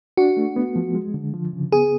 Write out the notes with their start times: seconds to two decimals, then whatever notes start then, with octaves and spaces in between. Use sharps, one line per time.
0.17 D4 F#4
0.37 A3
0.56 B3
0.76 F3
0.95 G#3
1.14 D3
1.34 F3
1.53 C#3
1.72 B3 G#4